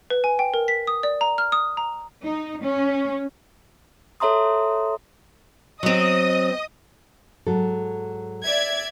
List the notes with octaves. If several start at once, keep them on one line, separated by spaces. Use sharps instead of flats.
B4
G#5
G5
A#4
B6
D#6
D5
A#5
F6
D#6
A#5
D#4
C#4
A4 C#5 E5 A#5 C6 D#6
F#3 C4 D#5 D#6
G#2 F#3 A4
D5 E5 G#6